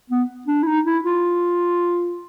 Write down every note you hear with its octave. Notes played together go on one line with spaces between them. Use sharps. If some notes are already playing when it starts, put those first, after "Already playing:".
B3
D4
E4
D#4
E4
F4